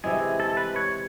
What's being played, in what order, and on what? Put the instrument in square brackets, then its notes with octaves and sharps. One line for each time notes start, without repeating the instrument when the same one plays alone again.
[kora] C3 E3 G#3 [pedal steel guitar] G#4
[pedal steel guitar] A4
B4
C#5